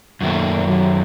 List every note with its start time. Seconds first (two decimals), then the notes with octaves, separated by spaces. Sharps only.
0.21 F#2 A#2 D#3 A3
0.67 F#3